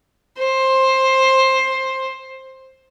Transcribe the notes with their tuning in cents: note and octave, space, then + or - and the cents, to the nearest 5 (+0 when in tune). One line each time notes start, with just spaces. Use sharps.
C5 +15